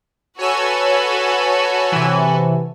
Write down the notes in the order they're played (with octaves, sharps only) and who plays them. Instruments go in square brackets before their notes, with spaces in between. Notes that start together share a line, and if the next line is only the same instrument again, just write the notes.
[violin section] F#4 A4 B4 [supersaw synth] C#5 G#5 E6
[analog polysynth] C3 E3